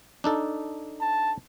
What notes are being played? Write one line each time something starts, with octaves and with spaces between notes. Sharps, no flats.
D4 D#4 A4
A5